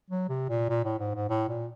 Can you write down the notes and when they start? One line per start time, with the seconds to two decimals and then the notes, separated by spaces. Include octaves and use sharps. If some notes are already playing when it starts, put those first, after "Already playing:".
0.10 F#3
0.29 C3
0.49 A#2
0.69 A#2
0.84 A2
0.99 G#2
1.15 G#2
1.29 A2
1.49 A#2